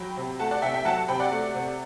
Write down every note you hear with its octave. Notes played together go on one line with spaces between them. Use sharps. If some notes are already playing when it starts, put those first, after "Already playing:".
Already playing: F#3 G5 B5
C3
A3 F#5 A5
D5 F#5
C3 E5 G5
E5 G5
F#3 F#5 A5
C3 G5 B5
D5 F#5
A3
C3